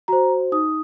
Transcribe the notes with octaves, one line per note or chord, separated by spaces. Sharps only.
F#4 C5 A#5
D#4 D#6